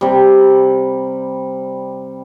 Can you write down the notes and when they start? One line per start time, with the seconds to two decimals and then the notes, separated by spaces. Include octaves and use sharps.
0.01 C3 G3